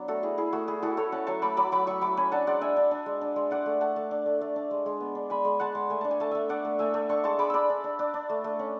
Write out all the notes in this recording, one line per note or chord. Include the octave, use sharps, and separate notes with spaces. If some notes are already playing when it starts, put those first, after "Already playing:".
Already playing: F#3 B3 D4
A3 F#4 A4
E4 G#4
E4 G#4
A3 F#4
E4 G#4
E4 F#4 A4
A3 A4 C#5
C#4 F#5 A5
F#3 A5 C#6
A3 B5 D6
F#3 B5 D6
F#3 B5 D6
F#3 C#6 E6
F#3 B5 D6
C#4 G#5 B5
D4 F#5 A5
G#3 D5 F#5
D4 E5 G#5
D4
D4
G#3
D4
G#3
D4 D5 F#5
A3
A3 F#5 A5
A3
D4
A3
A3
D4
G#3
G#3
B3
D4
G#3 G#5 B5
G#3
G#3 F#5 A5
G#3
A3 G#5
D4 A5
G#5
A3 A5
A3 E5 G#5
D4 D5 F#5
A3
A3 E5 G#5
A3
D4 A5 C#6
G#3 A5 C#6
G#3 B5 D6
D4 B5 D6 E6
D4
D4
D4
D4
A3
A3
C#4